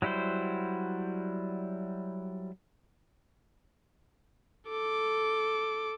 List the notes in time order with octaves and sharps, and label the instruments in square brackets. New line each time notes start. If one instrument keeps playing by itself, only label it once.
[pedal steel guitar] F#3 G3 E4 F#4 C5
[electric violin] A4 D6